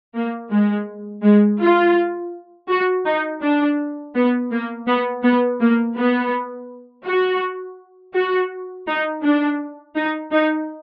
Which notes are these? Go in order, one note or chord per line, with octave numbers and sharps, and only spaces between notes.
A#3
G#3
G#3
F4
F#4
D#4
D4
B3
A#3
B3
B3
A#3
B3
F#4
F#4
D#4
D4
D#4
D#4